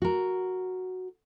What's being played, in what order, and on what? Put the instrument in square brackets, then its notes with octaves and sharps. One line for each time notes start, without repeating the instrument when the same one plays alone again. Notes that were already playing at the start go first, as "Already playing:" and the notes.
[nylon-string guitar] F#4 A#4